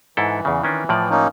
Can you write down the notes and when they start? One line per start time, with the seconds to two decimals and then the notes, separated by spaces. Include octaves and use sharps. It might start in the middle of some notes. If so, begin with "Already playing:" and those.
0.17 G#2 E3 E4 A4
0.45 E2 C#3
0.63 D#3 C#4 D4
0.89 A2 F3 D5
1.10 A#3 C#4 D#4